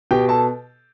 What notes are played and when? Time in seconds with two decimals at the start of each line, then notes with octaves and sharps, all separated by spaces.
0.11 B2 G4 G5
0.29 A4 A5